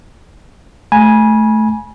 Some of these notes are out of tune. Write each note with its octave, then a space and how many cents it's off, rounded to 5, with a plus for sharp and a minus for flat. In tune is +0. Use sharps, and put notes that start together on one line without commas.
A3 -15 G#5 +0 B5 -35